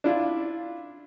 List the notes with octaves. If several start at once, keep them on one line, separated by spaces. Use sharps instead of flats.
D4 E4 F4